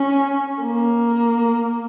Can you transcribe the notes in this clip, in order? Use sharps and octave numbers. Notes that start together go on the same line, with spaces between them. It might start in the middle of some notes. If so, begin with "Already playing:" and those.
Already playing: C#4
A#3